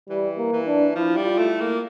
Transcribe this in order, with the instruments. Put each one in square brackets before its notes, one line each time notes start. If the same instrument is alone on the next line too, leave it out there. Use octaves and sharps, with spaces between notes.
[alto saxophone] E3 [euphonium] G3
[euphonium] A#3
[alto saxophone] E3
[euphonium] D4
[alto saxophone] F3 [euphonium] E4
[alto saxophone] G3
[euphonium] F4
[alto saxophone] A3
[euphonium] E4
[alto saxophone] A#3